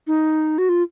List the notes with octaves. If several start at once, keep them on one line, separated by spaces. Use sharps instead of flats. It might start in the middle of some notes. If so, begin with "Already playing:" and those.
D#4
F#4
F4